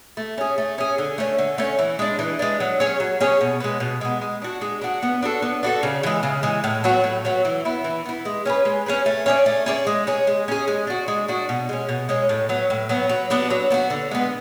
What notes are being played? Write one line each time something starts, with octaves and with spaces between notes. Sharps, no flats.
A3
C#4 G#4
A3
C#4 G#4
D3
A3 C#4
D3
A3 C#4
E3
G#3 D4
E3
G#3 D4
F#3
C#4 G#4 C#5
F#3
C#4 G#4 C#5
B2
G#3 B3
B2
G#3 B3
G#3
D4 F#4
G#3
D4 F#4
B3
D4 F#4 A4
B3
D4 F#4 A4
C#3
E3 G#3
C#3
E3 G#3
A2
F#3 B3 F#4
A2
F#3 B3 F#4
E3
B3 E4
E3
B3 E4
G#3
C#4 G#4 B4
G#3
C#4 G#4 B4
A3
C#4 G#4 D5
A3
C#4 G#4 D5
G#3
C#4 G#4
G#3
C#4 G#4
G#3
D4 F#4
G#3
D4 F#4
B2
G#3 C#4
B2
G#3 C#4
A2
F#3 B3
A2
F#3 B3
F#3
B3 D4 F#4
F#3
B3 D4 F#4
D3
G#3 B3